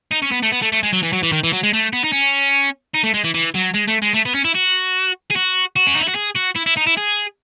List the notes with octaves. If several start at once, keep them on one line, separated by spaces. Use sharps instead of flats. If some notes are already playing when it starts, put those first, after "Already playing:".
D#4
C#4
B3
A3
B3
A3
A3
G#3
F#3
E3
F#3
E3
D#3
E3
F#3
G#3
A3
B3
D#4
C#4
D#4
A3
G#3
E3
E3
F#3
G#3
A3
G#3
A3
B3
C#4
E4
F#4
G#4
F#4
F#4
C#4
D#4
E4
F#4
G#4
F#4
E4
E4
D#4
E4
G#4